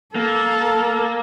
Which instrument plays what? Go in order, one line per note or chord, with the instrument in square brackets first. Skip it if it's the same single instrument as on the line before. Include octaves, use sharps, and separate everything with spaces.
[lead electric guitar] A#3 [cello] A4